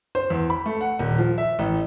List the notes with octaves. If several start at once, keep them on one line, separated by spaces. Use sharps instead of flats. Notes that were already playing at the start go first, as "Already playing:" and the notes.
C5
E2
B5
A3
F#5
D#1
F3
E5
A1